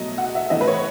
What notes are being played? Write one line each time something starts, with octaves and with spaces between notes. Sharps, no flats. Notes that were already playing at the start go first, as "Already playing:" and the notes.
Already playing: B2 F#3 A3 D#5
F#5
E5
A2 E3 A3 D#5
B4
C#5